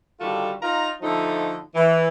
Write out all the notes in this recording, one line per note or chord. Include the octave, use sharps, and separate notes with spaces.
D3 D#3 G3 F4 F#4 A4
D#4 F4 A#5
D3 F3 A3 D#4
E3